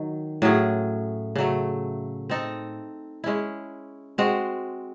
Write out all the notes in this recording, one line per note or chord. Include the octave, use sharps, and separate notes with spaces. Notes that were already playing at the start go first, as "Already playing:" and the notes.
Already playing: D#3 F#3
A2 F#3 C#4 G#4
C#3 F#3 A3
C4 D#4 A4
G#3 C#4 E4
G#3 C4 F#4